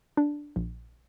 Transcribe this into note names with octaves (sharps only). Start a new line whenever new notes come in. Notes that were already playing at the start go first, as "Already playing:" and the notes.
D4
A#1